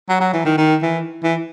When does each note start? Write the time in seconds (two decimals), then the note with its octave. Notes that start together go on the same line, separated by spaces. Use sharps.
0.10 F#3
0.21 F#3
0.33 E3
0.45 D#3
0.58 D#3
0.82 E3
1.24 E3